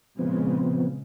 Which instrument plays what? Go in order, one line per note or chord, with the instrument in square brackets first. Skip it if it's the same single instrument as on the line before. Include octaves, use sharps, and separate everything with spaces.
[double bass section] A#2 C#3 G#3 [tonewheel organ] F3 B3 C4